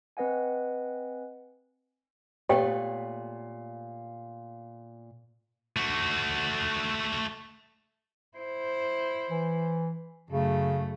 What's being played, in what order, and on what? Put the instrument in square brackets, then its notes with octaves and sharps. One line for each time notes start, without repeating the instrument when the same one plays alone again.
[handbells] C4 B4 D#5 F#5 G#5
[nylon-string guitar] A#2 A3 B3 [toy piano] G4 C#5 G5
[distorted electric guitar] A3 F#4
[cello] E4 C5
[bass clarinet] E3
[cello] F#2 A3 [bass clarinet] C#3